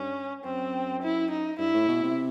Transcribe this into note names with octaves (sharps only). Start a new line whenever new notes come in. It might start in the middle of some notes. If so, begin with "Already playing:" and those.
Already playing: G2 C#4
F#2 C4
E4
D#4
G2 E4
A2
B2
C3